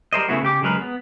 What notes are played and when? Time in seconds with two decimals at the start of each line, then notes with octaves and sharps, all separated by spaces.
0.13 G3 A#4 C5 D#5
0.29 C#3 A3 B3 E4 F#4
0.43 C#3 G4 D6
0.62 C#3 F#3 G#3 A#4 B4
0.81 B3